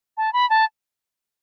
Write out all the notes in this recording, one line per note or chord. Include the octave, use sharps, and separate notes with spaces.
A5
B5
A5